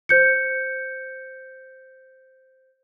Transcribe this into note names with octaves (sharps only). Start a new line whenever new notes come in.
C5 G6 C#7